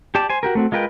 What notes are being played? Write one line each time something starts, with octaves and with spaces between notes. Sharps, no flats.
G4 D5 A5
C5 G#5
F#4 G4 A#4
A3 C4 F#4
G#3 F4 A#4 B4 G5